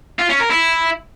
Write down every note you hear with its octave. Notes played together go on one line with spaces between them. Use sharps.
F4
C#4
A#4
E4